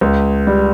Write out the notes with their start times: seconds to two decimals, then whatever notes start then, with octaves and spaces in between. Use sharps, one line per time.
0.01 C#2
0.47 G3